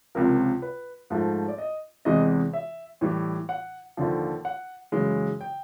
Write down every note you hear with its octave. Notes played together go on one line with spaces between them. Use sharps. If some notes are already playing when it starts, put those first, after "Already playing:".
C#2 C3 F3 A#4
B4
G#2 F3 A3
D5
D#5
E2 C3 E3 G#3 D#5
E5
A2 E3 G3
F#5
D#2 D3 F3
F#5
F#2 C#3 E3 G#3
G5